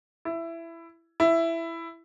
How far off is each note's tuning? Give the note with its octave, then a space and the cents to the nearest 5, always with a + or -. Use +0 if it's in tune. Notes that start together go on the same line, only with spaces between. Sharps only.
E4 +15
E4 +10